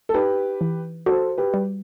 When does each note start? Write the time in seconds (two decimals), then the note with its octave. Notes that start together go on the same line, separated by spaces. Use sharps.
0.09 A4
0.14 D#4 G4 B4
0.61 E3
1.06 F#4 A4 C5
1.38 G4 B4
1.54 G3